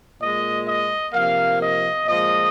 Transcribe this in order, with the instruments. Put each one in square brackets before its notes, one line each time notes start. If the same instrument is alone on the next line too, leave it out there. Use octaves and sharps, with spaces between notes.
[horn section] A#2 G#3 D#5
D#5
C3 F3 A#3 F5
D#5
A#2 F3 G#3 D#5